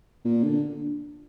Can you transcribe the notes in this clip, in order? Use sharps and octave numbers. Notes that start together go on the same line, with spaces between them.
A#2
D3